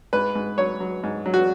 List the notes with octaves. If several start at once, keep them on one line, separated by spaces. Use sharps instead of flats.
G#2 B4
G#2
F#3 C#5
F#3
G#2
F#3
F#4